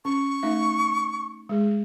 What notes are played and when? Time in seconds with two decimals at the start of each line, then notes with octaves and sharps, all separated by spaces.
0.05 C#4 C#6
0.43 A3 D#4 E5
1.49 G#3 G#4